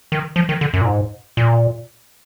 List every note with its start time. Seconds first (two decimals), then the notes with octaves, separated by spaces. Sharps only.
0.12 D#3
0.36 F3
0.49 D#3
0.61 D3
0.74 F#2
0.81 A#2
0.86 G#2
1.37 A#2